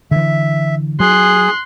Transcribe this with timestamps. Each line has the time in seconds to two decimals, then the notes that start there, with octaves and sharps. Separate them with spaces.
0.11 D3 E3 E5
1.00 F#3 G#4 C6 F#6